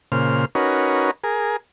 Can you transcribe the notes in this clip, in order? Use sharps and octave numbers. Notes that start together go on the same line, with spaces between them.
A#2 C#3 C5 F6
C#4 D#4 F#4 A#4 B4 C#5
G#4 A#4